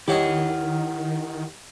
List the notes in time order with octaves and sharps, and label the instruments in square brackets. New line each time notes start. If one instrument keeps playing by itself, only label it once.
[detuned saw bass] D#3 [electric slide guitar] E4 F#5 [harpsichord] G4 C#5 D#5